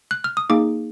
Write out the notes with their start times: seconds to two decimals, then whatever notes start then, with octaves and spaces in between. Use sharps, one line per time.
0.11 F#6
0.24 F6
0.37 D#6
0.50 A#3 D#4 G#4 D6